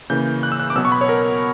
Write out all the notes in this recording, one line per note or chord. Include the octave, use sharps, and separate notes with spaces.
C#3 E3 A#3 G6
F#6
E6
F#6
D6
B2 F#3 B3 E6
C#6
B5
C#5
A#4